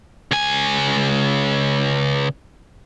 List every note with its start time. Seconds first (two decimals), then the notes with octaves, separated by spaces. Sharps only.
0.31 C#2 G#5